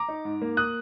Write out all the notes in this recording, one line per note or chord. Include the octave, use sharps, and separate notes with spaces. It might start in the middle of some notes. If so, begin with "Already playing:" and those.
Already playing: A#5 D6
D#4
G#2
A#3
D#6 F#6